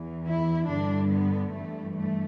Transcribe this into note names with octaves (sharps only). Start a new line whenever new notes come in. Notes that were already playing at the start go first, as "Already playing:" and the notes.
Already playing: E2 E3
E4
G2 D3 D4
B3
G2 E3 A3
A3